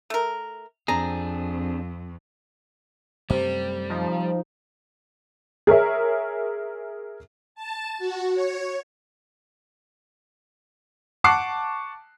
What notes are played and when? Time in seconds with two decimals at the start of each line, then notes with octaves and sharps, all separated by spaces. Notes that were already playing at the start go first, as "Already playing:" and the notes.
0.10 A3 A#4
0.88 F2 C4 D4 G#4 A#5
3.30 F#2 C3 G3 A3
3.90 F3 D#4
5.67 G#4 A#4 C#5 E5
7.55 A5
7.99 F#4
8.33 C#5
11.24 F#5 A5 C#6 D6 F#6 C7